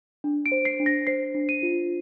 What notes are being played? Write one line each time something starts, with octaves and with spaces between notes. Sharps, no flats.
D4
D7
C5
C7
D4
A#6
C5 C7
D4
D#7
F4